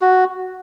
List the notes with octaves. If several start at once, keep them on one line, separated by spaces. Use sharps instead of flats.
F#4